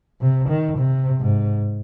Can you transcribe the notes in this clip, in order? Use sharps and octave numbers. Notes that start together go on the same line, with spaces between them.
C3
D#3
C3
G#2